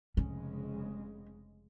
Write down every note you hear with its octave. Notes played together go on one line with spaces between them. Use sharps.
F1 C#3 G#3 C#4